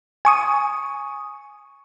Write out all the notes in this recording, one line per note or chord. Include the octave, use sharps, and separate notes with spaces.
G#5 C#6 D#6